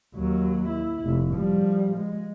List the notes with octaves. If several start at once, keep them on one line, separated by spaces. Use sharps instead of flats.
D#2 F#3
E4
F1
F3 G3
G#3